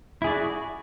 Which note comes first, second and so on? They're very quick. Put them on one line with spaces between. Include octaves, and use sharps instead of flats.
E4 G#4 D5 F#4